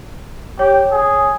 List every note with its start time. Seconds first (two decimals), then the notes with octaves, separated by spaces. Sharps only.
0.59 G4 C#5
0.91 G#4